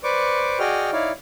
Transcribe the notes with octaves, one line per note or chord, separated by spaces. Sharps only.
B4 C5 D5 C#6 D6
F#4 G#4 D5 D#5 G5 F6
D#4 E4 C#5 D5 F5